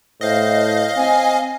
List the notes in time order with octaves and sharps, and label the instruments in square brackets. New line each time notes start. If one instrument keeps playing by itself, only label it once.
[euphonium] A2 [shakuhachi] C5 [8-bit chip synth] D#5 F5
[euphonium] C4 [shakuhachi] G#5